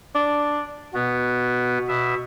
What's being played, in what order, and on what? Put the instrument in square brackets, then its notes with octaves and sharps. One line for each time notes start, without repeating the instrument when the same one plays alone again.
[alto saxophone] D4
[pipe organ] B2 B3 [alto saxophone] F#4
[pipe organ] B2 E5